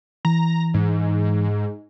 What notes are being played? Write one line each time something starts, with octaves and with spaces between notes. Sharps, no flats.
E3 A#5
G#2